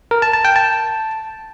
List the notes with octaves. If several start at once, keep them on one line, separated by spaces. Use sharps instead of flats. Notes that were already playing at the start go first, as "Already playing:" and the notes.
A#4
A5
A5
G5
A5